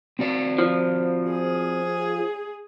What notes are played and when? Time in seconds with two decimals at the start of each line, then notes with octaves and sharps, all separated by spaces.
0.19 C4 F#4 D5
0.58 F3
1.30 G#4